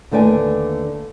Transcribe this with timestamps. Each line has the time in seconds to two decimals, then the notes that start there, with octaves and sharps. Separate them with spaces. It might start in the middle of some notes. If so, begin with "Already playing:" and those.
0.11 D#2 D3 A3 B4 D5 G#5